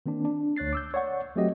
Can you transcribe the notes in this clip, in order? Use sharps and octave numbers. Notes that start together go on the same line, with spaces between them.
D#3 A#3 C4 D4
D4
D2 C#5 F#6 A6 C7
D6 E6 G6
C#5 D5 F#5 C#6
F#3 A3 C4 F#4 G4 D#5